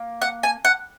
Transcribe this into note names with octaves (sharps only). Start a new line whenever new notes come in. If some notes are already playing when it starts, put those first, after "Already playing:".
Already playing: A#3
F#5
G#5
F#5